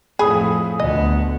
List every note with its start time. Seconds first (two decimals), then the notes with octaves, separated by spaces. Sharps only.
0.19 F2 A2 G#4 B5 D#6
0.80 D2 B3 D#5